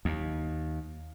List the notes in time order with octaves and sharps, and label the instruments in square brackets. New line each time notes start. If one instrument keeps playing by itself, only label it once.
[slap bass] D#2